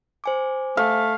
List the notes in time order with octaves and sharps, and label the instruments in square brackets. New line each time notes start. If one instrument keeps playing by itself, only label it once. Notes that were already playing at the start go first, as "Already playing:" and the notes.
[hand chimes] C5 G#5 D6
[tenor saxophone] A3 [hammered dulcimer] F5